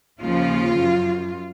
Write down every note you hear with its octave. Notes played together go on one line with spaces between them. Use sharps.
D#2 C#3 F3 F4
F#2